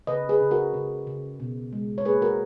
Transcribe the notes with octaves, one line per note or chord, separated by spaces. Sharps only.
C#3 B4 D#5
G#4 B4
C#3
F#4 A#4
C#3
C#3
B2
G#3
C#5
A#3 G#4 B4
F#4 A#4